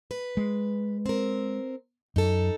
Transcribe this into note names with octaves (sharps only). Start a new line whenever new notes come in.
B4
G#3
C4 A#4
F#2 D#4 A4